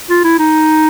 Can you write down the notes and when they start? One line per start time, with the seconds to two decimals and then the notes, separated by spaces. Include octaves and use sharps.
0.10 F4
0.24 E4
0.39 D#4